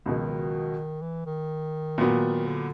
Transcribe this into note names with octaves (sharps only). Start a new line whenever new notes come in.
C#2 B2 D#3 F#3
E3
D#3
A#2 F#3 B3
D3